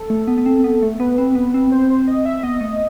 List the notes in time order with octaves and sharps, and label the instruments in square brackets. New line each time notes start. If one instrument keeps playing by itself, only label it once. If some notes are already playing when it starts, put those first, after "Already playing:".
Already playing: [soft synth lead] A4
[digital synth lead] A3
B3
B3
C4
B3
A3
[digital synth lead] B3 [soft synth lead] B4
[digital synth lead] C4
B3
C4
[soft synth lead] C5
C5
D#5
E5
[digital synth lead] B3 [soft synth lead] D#5
[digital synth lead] A3